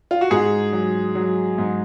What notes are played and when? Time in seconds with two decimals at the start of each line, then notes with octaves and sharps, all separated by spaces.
0.11 F4
0.21 F#4
0.31 G#2 G#4
0.73 F#3
1.15 F#3
1.58 G#2